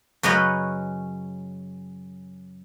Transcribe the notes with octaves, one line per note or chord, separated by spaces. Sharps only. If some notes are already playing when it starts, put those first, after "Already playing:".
F#2 C#3 C#4 A#4 B4 D#5